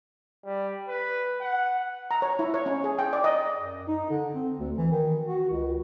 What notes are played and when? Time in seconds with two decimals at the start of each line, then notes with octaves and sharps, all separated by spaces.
0.45 G3
0.88 B4
1.41 F#5
2.11 A#5
2.22 C#5
2.39 E4
2.54 C#5
2.66 C#4
2.84 G#4
2.99 G5
3.13 D5
3.24 D#5
3.56 F#2
3.88 D#4
4.10 D3
4.35 C4
4.59 D2
4.78 E3
4.92 D#3
5.27 F#4
5.50 C#2